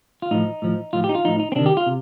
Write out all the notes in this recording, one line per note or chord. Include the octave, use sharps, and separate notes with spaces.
F4
A2 F3 D#4
A2 F3
A2 F3 F4
G4
D#4
F4
A2 F3 D#4
D#4
C4
C3 D#3 D4
G4
F4
C3